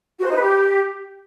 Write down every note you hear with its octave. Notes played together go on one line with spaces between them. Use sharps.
F#4
C5
D#4
B4
G4